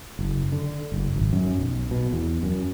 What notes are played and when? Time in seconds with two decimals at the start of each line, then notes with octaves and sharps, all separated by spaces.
0.19 F#1
0.52 D3
0.92 F#1
1.16 G#1
1.33 F#2
1.58 B1
1.91 B2
2.13 E2
2.43 F#2